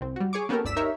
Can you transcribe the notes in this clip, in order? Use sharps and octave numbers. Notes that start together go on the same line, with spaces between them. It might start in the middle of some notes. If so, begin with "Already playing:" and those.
C2 C4
G3 F#4
G#4 C#5 C#6 D6
A#3 B3 C#4 G4 A4 A#4
G1 D2 D5 E6 B6 E7
D#4 G4 A#4 C#5 E5